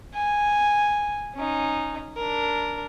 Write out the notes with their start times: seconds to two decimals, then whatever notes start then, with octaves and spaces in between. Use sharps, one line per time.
0.14 G#5
1.35 C#4 D#4
2.17 D4 A#4